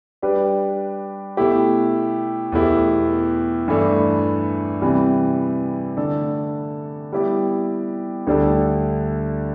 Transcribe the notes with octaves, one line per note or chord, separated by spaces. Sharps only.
G3 D4 G4 B4
B2 A3 E4 G4
E2 B2 A3 E4 G4
G2 E3 A3 D4
C3 E3 G3
D3 A3 D4 A4
G3 B3 E4 G4
D2 D3 G3 D4 A4